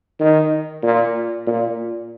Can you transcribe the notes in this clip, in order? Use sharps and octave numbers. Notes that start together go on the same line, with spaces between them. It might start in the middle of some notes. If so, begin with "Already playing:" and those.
D#3
A#2
A#2